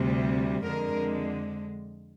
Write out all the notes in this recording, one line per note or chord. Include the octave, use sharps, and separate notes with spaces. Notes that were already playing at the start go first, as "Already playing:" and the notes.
Already playing: D2 C3 G3
F2 D3 G#3 A#4